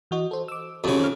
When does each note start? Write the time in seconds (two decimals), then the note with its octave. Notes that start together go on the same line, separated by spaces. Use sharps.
0.11 E3 F#4 D#5
0.31 A4 C5
0.48 D6 E6
0.84 F2 C#3 F#4 G4 C5
1.00 D#3 F6